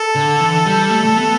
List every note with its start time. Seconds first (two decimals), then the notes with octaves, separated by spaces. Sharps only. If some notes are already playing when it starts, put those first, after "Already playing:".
Already playing: A4
0.15 D3
0.41 E3
0.66 G3
0.90 A3
1.06 A3
1.17 B3